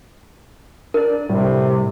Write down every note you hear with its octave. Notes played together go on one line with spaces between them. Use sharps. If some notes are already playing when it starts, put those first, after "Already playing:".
D4 A#4 D5
A2 C3 G3